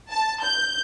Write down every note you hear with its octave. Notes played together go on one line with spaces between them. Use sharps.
A5
G6